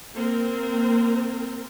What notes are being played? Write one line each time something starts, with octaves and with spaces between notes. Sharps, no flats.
A#3 C4 A#4